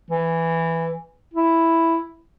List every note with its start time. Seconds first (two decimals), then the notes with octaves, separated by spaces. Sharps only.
0.11 E3
1.34 E4